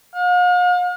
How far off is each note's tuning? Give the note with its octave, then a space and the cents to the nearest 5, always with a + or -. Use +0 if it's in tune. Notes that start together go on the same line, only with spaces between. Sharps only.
F5 +45